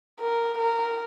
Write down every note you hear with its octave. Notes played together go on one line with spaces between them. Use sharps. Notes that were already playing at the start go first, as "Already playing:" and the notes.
A#4
A#4